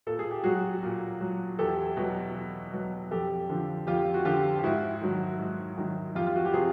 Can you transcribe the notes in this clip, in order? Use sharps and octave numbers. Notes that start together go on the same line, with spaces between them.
A#2 A4
G#4
G4
F#3 F#4 G#4
A#2
F#3
E2 G4 A4
B2 F#3
E2
B2 F#3
F2 G4 A4
D3 F3
F2 F4 G4
F#4
D3 F3 F4 G4
G4
G#2 E4 F#4
D#3 F#3
G#2
D#3 F#3
F2 F4 G4
F4
F#4
G4
C3 F3 F#4 G#4